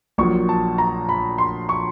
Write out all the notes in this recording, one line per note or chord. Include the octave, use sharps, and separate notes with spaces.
A#1 A#2 F#3 C#6
A5
A#5
B5
C6
C#6